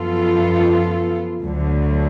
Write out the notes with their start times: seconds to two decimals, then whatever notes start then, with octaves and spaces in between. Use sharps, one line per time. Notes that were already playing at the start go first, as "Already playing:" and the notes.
Already playing: F#2 F3 B3 F4 A4
1.44 D2 D3 F#3